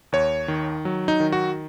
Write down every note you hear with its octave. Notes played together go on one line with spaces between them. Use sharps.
D#2 C#5
D#3
F#3
D#4
D#3
F#4